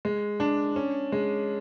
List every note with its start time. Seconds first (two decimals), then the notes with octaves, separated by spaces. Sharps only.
0.05 G#3
0.40 D4
0.76 C#4
1.12 G#3